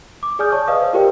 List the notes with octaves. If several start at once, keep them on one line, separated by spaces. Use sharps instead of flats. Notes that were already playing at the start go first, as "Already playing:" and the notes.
D6
G#4 D5 G#5 D#6 F6 G6
C#5 D5 A5 C#6
B4 D5 D#5 F5 D#6
C5
F4 G4 A#4 C5 D5 G5